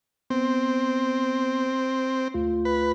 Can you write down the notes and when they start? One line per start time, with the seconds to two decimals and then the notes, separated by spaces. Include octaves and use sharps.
0.30 B3 C4
2.34 D2 A3 F4
2.65 B4